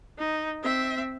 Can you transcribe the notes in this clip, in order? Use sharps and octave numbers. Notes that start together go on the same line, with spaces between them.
D#4
C4 E5